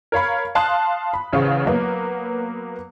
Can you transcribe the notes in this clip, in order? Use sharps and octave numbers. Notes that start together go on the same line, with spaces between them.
A#4 C#5 F5 B5
F5 A5 C6 D#6 F#6
B5
A1 C#3 C5 F5 C#6
F#3 A#3 B3